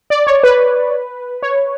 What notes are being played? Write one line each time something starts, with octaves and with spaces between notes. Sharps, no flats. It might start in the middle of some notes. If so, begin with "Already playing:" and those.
D5
C#5
B4
C#5